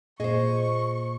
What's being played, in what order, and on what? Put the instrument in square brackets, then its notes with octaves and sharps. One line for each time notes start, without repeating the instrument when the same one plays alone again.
[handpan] A#2 [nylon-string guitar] G#4 C5 [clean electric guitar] D#5 [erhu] C#6